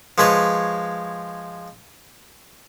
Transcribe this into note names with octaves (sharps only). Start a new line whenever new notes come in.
F3 G#3 B4 C#5 C#6